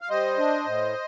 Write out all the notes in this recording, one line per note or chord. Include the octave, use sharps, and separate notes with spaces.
F5
G3 C5 D#5
D4
A2